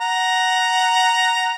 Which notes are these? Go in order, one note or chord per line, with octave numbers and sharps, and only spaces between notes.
F#5 A#5